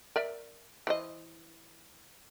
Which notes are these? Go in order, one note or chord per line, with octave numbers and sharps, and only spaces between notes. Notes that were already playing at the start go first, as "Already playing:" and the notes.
A#4 D5 E5
E3 C5 D#5